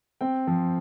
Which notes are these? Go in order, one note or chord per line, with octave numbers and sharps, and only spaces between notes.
C4 G5
F3